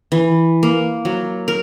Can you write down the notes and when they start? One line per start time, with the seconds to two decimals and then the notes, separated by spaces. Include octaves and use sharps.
0.12 E3
0.63 A#3
1.05 F#3
1.48 A#4